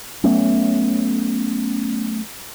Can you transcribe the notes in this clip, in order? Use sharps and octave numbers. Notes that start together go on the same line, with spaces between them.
F#3 A3 B3 C#4